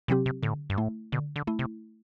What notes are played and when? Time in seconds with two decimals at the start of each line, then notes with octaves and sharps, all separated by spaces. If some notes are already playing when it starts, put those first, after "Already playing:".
0.08 C3 E3 F#3 C4 G4
0.26 C3
0.43 A2 D3
0.70 G2
0.78 A2 A3 E4
1.12 B2 D3
1.36 D3
1.47 A3 E4
1.59 C3